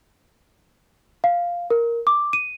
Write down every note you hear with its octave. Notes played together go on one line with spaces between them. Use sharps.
F5
A#4
D6
D#7